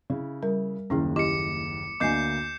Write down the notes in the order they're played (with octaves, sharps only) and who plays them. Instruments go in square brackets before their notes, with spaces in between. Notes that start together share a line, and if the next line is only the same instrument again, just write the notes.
[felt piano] C#3 E4
[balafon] G3 A#4
[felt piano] F#1 D#2 [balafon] C#4 E4 G#4
[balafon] E4 G4 D#5 [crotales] D6 C#7
[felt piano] D2 D3 A#3 [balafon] D#5 G#5 [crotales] D6 G6 C7